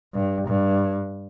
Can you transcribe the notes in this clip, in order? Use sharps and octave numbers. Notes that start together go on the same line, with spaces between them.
G2
G2